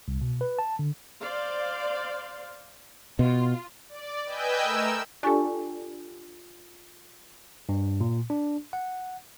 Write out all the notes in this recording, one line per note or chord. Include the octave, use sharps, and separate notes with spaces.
C2
B2
B4
A5
D3
C5 D5 F5
B2 F4
D5
B4 D#5 G5 G#5 E6 G6
A3 A#4 E6
D4 F4 G4 A4 G#5 C#6
G2
A#2
D4
F#5